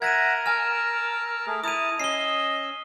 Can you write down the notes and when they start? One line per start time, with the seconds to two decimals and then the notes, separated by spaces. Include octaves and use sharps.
0.02 A#4 E5 F#5 G#6 A#6 D#7
0.46 G#5 A5 E6 F6
1.47 A3 G#4
1.64 E4 A5 A#5 D#6 D#7
2.00 C#4 D#5 E6 C7 G7